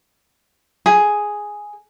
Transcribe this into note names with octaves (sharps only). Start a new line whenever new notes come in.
G#4